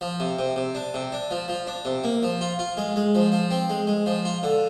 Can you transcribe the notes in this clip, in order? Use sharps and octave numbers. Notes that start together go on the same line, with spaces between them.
F3
C3
C3
C3
D4
C3
D4
F3
F3
D4
C3
A#3
F3
F4
F4
G#3
G#3
F3
F3
C4
G#3
G#3
F3
F4
D3